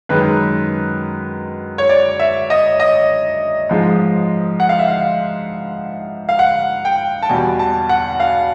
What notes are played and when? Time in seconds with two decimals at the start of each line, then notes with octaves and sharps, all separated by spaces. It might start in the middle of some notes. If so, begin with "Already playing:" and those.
0.09 F#2 D#3 G#3 B4
1.78 C#5
1.89 D5
2.19 E5
2.50 D#5
2.80 D#5
3.69 G#2 F3 G#3
4.60 F#5
4.69 F5
4.79 E5
4.88 F5
6.29 F5
6.39 F#5
6.85 G5
7.22 A5
7.29 E2 B2 G3 G#5
7.59 A5
7.89 F#5
8.20 F5